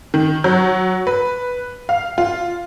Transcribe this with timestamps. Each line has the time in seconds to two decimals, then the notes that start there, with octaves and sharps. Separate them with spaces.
0.14 D#3
0.44 F#3
1.07 B4
1.89 F5
2.18 F4